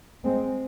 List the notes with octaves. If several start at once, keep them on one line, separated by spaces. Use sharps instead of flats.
G#3 C4